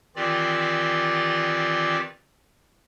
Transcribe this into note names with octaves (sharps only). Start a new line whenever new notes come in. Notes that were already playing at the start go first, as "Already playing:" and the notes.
D#3 E3 C4 F4 G4 D5